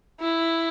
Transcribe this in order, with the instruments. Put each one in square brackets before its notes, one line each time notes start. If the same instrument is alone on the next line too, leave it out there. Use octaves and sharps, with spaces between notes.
[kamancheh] E4